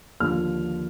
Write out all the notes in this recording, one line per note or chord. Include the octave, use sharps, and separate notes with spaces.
D#2 D3 F3 F6